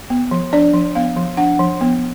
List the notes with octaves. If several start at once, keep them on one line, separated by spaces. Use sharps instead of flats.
B3
F3
D4 D5
F3
B3 F5
F3
D4 F#5
F3
B3